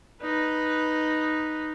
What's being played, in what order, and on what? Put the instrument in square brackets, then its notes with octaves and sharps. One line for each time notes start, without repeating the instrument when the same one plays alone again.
[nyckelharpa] D#4 B4